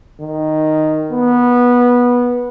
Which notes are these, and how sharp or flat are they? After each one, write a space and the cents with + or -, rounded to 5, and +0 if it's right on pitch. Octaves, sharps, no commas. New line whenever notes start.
D#3 -5
B3 -15